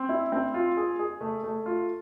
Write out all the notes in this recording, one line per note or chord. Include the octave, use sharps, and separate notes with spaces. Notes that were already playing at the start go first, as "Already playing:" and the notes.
Already playing: C4
E4
C4
F4
G#4
G#4
A3
A3
F4